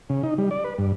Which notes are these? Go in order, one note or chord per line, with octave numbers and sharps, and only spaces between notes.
C#3
D#4
G3
D5
B4
G2